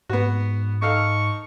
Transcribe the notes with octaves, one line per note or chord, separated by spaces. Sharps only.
G#2 B3 F#4
D#4 A4 F5 C#6